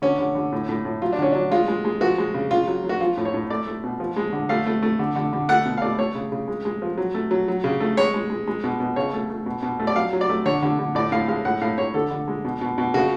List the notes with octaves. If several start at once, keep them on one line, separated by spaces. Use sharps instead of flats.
D3 C#4
D3
D3
A2
A2
A2
F#3 F4
D4
D3 C#4
F#3 D4
G#3 F4
G#3
G#3
F3 F#4
G#3
C#3
C#3 F4
F#3
F#3
F#4
F3 F4
A2
C#5
A2
A3 D5
A3
B2
F3
G#3
D3
A3 F5
A3
A3
D3
D3
D3
A3 F#5
B2
F5
A3 D5
A3 C#5
C#3
C#3
G#3
G#3
F3
F#3
A3
F#3
F#3
C#3
A3
G#3 C#5
G#3
G#3
G#3
B2
B2
C#3 C#5
A3
A3
B2
B2
A3
D5
F#3 F5
F#3
D5
A3
D3 C#5
D3
D3
A2 D5
A2 F5
G#3 F5
A2 F#5
A2 F5
A2 C#5
D3 A4
D3
G#3
B2
B2
B2
C#3 F#4